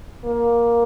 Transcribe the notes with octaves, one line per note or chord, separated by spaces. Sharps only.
A#3